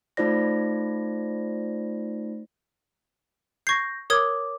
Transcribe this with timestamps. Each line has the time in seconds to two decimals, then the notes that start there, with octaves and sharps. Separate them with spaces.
0.17 A3 D#4 F4 C5 D5 A#6
3.67 C#6 G6 G#6 A#6 C7
4.10 A#4 C#5 D6 D#6 G#6